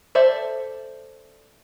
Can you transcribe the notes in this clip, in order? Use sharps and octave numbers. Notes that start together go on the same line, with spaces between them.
A4 C5 D5 E5